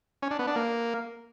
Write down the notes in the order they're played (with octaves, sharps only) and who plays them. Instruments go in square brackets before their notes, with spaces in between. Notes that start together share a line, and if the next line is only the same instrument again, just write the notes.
[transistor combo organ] C#4
D4
B3
D4
A#3